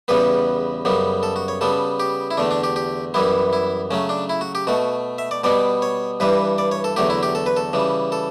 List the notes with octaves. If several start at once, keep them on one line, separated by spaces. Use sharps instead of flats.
E2 C#3 G3 B3 B4
F#2 C#3 G3 B3
A4
F#4
C#5
C#3 G3 B3 A4
G4
E4
E2 D3 A3 D4
D4
G4
G4
F#2 E3 G3 B3 E4
E4
C#3 F#3 A3 C#4
D4
E4
F#4
G4
B2 A3 F#4
E5
D5
B2 G3 B3 D5
C#5
G2 E3 G3 B4
D5
C#5
A4
E2 D3 F#3 A3 G4
E4
G4
A4
B4
A4
C#3 E3 G3
A4